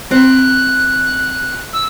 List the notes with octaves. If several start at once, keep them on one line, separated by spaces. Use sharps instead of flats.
C4 F#6
E6